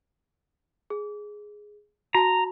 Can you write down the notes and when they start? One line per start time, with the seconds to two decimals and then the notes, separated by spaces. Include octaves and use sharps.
0.90 G#4
2.15 F#4 A5 A#5